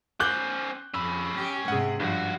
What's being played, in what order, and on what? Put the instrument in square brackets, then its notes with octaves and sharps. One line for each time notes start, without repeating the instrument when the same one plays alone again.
[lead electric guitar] C#4 C5 [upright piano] D6 F#6 G6
[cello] F2 [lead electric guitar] C#4 B5 [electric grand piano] E6
[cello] G4
[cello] G#2 C3 [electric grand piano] G#4 F#5
[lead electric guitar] C#2 F#4 [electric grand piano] G2 [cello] F3